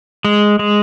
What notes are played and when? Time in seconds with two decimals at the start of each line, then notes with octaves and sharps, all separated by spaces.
0.25 G#3
0.59 G#3